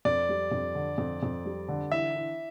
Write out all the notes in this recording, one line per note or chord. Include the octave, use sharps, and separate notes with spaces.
F2 D5
G3
F2
D3
F2
F2
G3
D3
E3 E5
E4